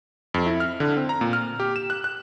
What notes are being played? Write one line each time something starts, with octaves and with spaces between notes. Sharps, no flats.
F2
E4
F6
D3
C4
A#5
A#2
F6
G4
E7
F#6
F#6